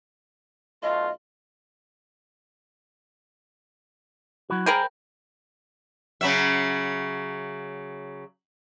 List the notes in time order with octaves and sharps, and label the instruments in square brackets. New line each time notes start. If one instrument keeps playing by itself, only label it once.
[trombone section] B1 A3 F4 [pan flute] D#5
[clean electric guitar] F#3 E4 F#4
[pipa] G#4 A#4 A#5 [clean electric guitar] C5 G5 B5
[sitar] C#3 F#3 E5